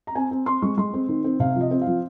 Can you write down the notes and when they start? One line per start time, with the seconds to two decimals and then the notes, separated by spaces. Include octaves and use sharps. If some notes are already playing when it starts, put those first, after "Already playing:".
0.07 A#5
0.15 C4 G#5
0.31 C4
0.46 C4 C6
0.62 G#3 C#6
0.78 G#3 C6
0.94 C4
1.09 D#3
1.24 C4
1.40 C3 F5
1.56 F3
1.61 D#5
1.71 C4
1.81 F5
1.87 F3